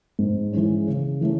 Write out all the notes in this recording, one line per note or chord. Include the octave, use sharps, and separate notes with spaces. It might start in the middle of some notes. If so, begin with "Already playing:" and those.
G#2
E3 G#3 C#4
C#3
E3 A3 C#4